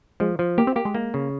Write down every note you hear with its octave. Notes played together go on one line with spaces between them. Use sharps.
F3 G#3
F3
A#3 G4
C4
A#3 G4
G#3
A#3
C#3